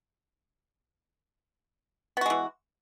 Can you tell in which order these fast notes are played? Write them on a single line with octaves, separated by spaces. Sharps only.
B3 F#4 G#3 E3